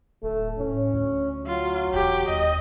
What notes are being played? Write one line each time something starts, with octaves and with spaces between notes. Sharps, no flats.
D1 A3
A2 C#4
D2
F#3 F4
E1 G4
D#2 D#5